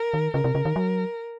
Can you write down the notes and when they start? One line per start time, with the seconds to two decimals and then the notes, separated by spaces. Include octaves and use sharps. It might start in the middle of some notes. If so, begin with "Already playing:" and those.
Already playing: A#4
0.14 D#3
0.34 C#3 A#4
0.44 C3
0.55 C#3
0.65 D#3
0.76 F#3